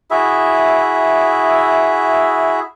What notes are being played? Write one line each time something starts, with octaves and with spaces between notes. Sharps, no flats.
E4 F#4 G#4 E5